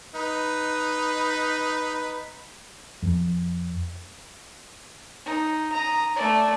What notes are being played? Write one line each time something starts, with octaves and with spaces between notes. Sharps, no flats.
D#4 B4
F2
D#4
A#5 D#6
A3 D5